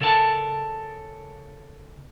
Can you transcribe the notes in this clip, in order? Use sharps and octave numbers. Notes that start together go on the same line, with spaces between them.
C#3 A4 A#4 F5 A5